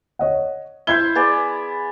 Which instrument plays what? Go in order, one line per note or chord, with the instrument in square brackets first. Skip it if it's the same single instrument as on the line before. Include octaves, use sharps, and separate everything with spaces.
[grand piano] C#5 D#5 F#5
[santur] E4 C5 [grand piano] G6 G#6 G7
[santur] B3 G#4 D5